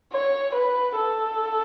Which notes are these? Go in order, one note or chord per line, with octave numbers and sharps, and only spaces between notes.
C#5
B4
A4